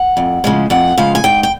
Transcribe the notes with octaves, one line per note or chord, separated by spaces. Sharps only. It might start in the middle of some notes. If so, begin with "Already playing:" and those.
Already playing: F#5
F2
C#3 F3 G#3
F2 F#5
C#3 F3 G#3 F5
G#5
G#2 G5
G5